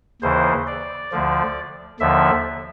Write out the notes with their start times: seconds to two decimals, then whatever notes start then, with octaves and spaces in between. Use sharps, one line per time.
0.22 D#2 C#3 E3 C5
0.67 D5
1.12 D2 D3 F3
2.00 D#2 D3 F3 E5